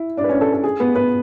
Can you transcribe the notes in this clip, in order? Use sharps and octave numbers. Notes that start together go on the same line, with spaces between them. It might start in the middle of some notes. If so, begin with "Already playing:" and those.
Already playing: E4
D4 D5
B4
C#4 C#5
A4
A4
G#4
B3 B4
B3 B4